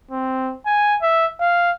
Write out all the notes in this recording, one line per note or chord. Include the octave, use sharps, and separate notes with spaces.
C4
G#5
E5
F5